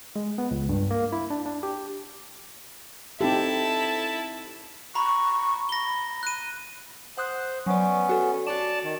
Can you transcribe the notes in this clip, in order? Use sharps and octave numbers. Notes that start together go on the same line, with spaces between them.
G#3
B3
C#2
G2
A#3
E4
D4
D4
G4
C4 D#4 E4 G4 A4 A5
A#5 B5 C#6
B5 A#6 G7
F#6 D#7
C5 F#5 D#6 F#6
F#3 B3 C#4 D5
F#4 A4
F#4 D5 A5 E7
D#3